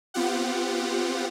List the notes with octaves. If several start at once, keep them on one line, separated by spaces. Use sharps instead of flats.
B3 C4 F4 G4 F#5